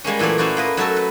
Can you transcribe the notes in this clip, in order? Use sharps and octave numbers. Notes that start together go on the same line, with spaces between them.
G3 G#3 A#3 C#4
A#2 E3 F#3 A3 D5
C#4 E4 F#4 C5 D5
A#3 B4 D#5
F#3 A3 F#4 A4 A#4
B4